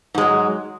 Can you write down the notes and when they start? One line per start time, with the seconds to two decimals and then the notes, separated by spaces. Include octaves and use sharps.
0.14 G#2
0.18 G#3
0.21 F#3